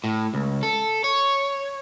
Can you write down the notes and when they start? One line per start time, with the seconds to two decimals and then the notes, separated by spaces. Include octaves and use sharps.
0.04 A2
0.34 C#2
0.63 A4
1.04 C#5